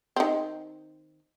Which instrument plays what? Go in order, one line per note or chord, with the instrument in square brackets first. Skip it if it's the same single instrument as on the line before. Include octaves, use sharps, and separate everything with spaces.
[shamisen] D#3 C4